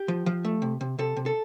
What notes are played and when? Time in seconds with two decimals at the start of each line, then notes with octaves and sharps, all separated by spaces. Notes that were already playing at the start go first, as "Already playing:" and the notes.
Already playing: G4
0.08 F3
0.26 F3
0.45 A3
0.62 C3
0.81 C3
0.99 C3 A4
1.16 C3
1.26 A4